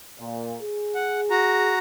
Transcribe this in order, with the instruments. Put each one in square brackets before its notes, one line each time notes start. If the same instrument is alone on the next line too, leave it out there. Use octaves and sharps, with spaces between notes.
[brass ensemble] A#2
G#4
[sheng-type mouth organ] F#5
F#4 A#5